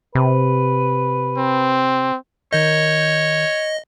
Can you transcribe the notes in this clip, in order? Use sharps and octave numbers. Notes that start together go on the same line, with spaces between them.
C3 B4
C4
D#3 A#4 C#5 D#5 G6